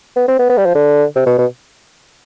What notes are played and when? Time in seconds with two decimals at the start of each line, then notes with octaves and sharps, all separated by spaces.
0.16 B3
0.28 C4
0.39 B3
0.49 B3
0.57 G3
0.66 F3
0.75 D3
1.15 C3
1.26 B2
1.38 B2